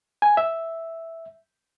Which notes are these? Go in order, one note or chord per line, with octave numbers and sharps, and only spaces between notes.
G#5
E5